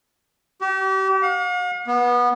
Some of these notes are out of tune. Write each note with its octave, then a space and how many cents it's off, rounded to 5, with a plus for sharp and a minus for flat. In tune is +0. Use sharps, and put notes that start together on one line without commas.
G4 -35
F5 +45
B3 -20